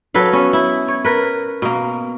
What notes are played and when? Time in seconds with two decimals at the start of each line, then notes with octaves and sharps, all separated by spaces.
0.14 F#3 A4 B4 F5
0.33 B3 C#4
0.53 E4
0.88 C#5
1.05 A#4 B4
1.62 B2 A#3